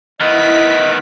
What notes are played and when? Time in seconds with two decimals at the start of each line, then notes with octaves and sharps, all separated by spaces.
0.20 D#3 B3 E4 D#5 B6